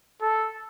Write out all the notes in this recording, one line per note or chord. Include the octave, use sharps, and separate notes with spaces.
A4